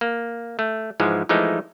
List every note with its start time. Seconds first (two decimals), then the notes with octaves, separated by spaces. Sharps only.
0.01 A#3
0.59 A3
1.00 G#2 E3 F3 G#3
1.29 E3 F3 G#3 A3 D#4